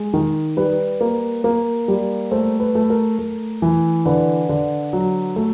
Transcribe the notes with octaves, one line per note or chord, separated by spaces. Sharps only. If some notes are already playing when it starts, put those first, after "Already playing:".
Already playing: G#3
D#3
G3 B4
A#3
A#3
G3
A3 C5
B4
A3
A#4
A3
E3
D3 B4
D3
F#3
A3